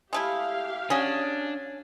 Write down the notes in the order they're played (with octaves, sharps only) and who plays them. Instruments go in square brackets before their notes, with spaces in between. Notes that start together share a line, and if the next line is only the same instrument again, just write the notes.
[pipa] G#3 A3 E4 [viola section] G4 F5
[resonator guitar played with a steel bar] C#4 [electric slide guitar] D4 [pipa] F#4 G#4